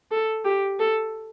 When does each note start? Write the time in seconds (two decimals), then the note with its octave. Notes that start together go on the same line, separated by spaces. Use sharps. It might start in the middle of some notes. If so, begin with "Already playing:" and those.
0.11 A4
0.45 G4
0.79 A4